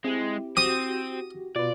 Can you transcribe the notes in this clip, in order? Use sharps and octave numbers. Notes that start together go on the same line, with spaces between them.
G#3 C4 E4 G4
C4 F#4 G4 D#6 A#6
B2 F4 B4 D5